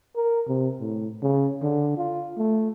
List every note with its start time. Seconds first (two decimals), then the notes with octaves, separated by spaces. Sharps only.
0.16 A#4
0.48 C3
0.80 A2
1.23 C#3
1.62 D3
1.97 F4
2.37 A3